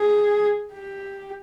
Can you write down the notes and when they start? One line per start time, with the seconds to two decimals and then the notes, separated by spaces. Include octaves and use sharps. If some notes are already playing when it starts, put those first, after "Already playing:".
Already playing: G#4
0.73 G4